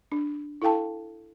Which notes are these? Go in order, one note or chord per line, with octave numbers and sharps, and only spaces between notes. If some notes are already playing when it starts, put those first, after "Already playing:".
D4
E4 A4 F5 G5 A5